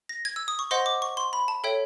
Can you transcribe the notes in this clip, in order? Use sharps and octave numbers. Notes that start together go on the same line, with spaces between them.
A#6
G#6
E6
D#6
C#6
C5 D#5 F#5 C6
D6
C#6
C6
B5
A5
A4 C#5 E5 G5